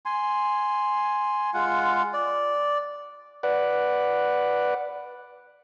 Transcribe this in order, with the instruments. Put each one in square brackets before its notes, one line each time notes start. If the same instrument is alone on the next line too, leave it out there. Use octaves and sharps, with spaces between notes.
[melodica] G#5 C6
G#3 F4 F#5
D5
[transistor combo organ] B4 D5 F#5